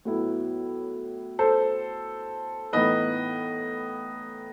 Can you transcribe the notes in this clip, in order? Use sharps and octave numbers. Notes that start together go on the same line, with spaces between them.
A2 F#3 B3 E4
A4 C5
A2 E3 B3 D#4 B4 D#5